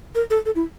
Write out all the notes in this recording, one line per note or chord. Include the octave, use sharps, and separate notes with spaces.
A#4
A4
A4
E4